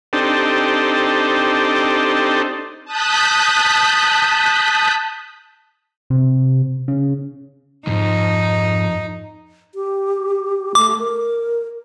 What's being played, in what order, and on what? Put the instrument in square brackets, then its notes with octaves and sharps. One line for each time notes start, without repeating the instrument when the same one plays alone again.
[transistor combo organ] C4 D4 D#4 G4 A4
[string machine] A5 D#6 F#6 G6 B6
[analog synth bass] C3
C#3
[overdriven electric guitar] F2 [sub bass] G#2 [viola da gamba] D#4
[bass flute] G4
[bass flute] A3 [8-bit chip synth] D6
[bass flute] A#4